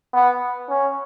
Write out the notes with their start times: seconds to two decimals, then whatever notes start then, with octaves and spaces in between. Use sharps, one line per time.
0.13 B3
0.70 C#4